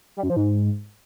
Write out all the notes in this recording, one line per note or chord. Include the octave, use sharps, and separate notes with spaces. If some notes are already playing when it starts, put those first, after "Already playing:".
G3
F#2
F3
G#2